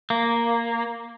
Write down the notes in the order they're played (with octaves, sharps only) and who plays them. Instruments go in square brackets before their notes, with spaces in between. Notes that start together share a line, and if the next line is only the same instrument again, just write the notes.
[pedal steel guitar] A#3